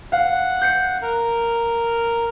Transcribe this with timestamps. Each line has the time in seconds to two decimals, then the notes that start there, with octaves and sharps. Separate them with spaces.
0.12 F5 F#5
0.61 G6 C7 C#7
1.02 A#4